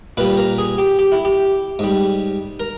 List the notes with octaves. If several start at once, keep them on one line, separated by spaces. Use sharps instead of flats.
A#2 G3 B4
A#4
G#4
G4
G4
E4
G4
G#2 G3
A#4